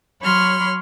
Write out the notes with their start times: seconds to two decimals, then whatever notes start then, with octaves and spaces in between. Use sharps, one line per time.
0.21 F#3 C#5 B5 C6 F6